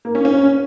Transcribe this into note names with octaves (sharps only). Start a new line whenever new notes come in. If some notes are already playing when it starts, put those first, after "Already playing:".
A#3
C#4
C#4